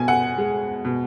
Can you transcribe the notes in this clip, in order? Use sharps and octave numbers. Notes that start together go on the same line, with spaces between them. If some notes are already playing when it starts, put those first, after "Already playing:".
Already playing: B2 G#5
F#5
G#3
B2